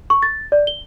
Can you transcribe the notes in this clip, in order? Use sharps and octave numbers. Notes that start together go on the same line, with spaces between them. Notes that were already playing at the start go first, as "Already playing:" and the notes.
C#6
A6
D5
G7